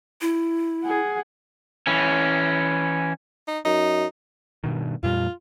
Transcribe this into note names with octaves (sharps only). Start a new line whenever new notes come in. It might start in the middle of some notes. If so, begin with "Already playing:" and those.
E4
G#4 F#5
E3 C#4
D#4
F#2 D#4
G2 B2 D#3
F2 A#2 G3 F4